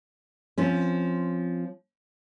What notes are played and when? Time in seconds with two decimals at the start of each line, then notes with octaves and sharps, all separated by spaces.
0.58 F3 C4 C#4